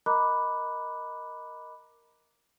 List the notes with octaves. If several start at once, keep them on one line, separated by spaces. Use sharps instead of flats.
A#4 D#5 A#5 B5 D6 F#6